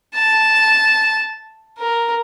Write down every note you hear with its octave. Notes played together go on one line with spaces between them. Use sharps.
A5
A#4